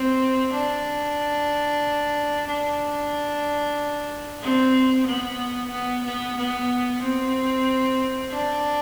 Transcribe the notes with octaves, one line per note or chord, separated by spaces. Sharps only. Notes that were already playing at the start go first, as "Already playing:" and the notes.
Already playing: C4
D4
D4
C4
B3
B3
B3
B3
C4
D4